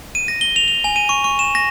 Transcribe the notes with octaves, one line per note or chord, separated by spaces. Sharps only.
D#7
A#6
G7
F7
F7
G#5
D#7
C#6
C#6
E7
A#6